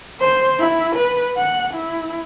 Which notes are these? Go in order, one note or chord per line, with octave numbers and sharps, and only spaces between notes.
C5
E4
B4
F#5
E4